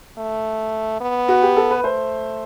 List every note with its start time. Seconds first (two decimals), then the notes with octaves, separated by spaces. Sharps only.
0.18 A3
1.01 B3
1.28 F#4
1.42 G4
1.56 A4
1.70 B4
1.84 A3 C5